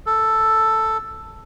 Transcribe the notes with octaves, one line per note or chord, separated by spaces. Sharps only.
A4